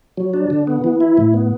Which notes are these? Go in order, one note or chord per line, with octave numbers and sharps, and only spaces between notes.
F#3
D4
D3
B3
E3
E4
A2
B3